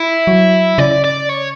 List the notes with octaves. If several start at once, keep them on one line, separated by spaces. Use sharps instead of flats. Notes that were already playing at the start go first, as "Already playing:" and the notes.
Already playing: E4
F#3
C#3 D5
D5
C#5